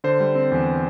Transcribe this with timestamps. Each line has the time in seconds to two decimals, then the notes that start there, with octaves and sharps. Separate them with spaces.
0.04 D3 C5
0.20 G3
0.35 C4
0.52 E2